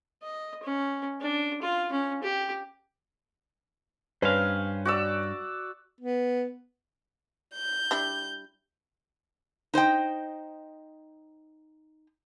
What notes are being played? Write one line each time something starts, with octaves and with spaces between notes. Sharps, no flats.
D#5
C#4
D4
F4
C#4
G4
G2 C#4 B4 C5 F5
F#4 D5 E6
B3
G6
G3 D4 E4
D#4 C5 D#5 G5